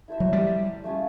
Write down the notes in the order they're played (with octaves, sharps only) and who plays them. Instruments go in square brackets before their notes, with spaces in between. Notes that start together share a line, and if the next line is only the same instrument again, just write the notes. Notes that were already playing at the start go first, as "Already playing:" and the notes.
[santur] E4 A4 C5 E5
[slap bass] F#3
G3
[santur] A3 C#4 F4 G#4